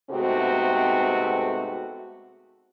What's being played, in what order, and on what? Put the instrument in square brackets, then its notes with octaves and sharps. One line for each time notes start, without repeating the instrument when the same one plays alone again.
[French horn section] G#2 C3 A3 B3 C4 F#4